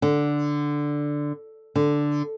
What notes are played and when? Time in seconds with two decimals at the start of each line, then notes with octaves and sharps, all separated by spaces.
0.02 D3
1.76 D3